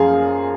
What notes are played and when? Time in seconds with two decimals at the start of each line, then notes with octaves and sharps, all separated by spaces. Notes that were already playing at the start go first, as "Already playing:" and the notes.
Already playing: F#2 F3 G#4 F5